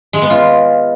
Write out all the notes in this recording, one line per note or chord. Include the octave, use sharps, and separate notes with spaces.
G#3
B3
F4